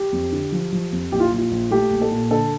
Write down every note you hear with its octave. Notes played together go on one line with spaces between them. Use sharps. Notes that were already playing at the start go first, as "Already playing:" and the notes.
Already playing: G4
F2
D3
F3
F3
F2
A#1 G4
F4
A#1
F4
A#1
A3 G4
A#1
A4
A#2
D3 A4